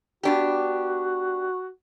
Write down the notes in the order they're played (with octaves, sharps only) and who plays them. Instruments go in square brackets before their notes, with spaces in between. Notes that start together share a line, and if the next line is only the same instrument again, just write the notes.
[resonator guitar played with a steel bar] B3 D4 G4 [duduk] F#4